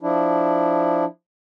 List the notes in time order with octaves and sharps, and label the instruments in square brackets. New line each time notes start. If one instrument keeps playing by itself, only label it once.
[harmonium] F3 D4 E4